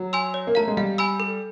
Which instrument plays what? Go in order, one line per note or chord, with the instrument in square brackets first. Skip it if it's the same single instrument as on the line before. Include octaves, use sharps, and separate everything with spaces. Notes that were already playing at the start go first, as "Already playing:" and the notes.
Already playing: [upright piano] F#3
[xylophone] G#5 C6 E6
C#5
[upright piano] A#3
[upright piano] A3 [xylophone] F5 A#5
[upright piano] G#3
[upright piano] G3 [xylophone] F5
[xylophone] G#5 B5 E6
A4